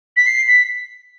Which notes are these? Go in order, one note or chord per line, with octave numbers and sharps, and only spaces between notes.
B6
C7
B6